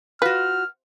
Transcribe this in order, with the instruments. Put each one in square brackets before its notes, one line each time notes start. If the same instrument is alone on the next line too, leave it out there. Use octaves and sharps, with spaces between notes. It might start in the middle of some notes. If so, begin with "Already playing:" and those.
[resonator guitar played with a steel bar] F4 F#4 [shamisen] B4 [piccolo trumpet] F6